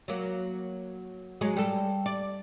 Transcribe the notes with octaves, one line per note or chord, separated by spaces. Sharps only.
F#3 A#3
F#3 G#3 G#4
G3 A4
D5